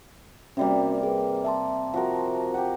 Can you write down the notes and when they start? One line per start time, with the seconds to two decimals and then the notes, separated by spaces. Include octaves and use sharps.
0.57 C3 G3 A#3 C#4 F#4 D5
1.03 G#4 B4
1.44 E5 A5 C6
1.94 F3 F#4 A#4
2.54 G4 F#5